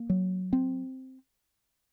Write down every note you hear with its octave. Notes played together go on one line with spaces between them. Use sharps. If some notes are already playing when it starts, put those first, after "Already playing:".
Already playing: A#3
F#3
C4